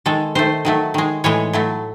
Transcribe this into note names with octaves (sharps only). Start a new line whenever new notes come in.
D#3 G#3 A4
D#3 A3 C5
D#3 F#3 A3
D#3 G#3
A2 E3 G#3 C#5
A2 F#3 A3